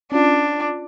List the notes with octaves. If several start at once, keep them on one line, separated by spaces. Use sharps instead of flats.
C#4 D4 F4